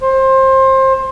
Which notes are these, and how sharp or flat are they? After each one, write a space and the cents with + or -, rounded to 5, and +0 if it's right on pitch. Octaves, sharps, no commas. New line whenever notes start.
C5 +25